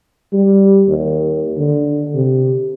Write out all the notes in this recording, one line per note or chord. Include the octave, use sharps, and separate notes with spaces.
G3
D#2
D3
C3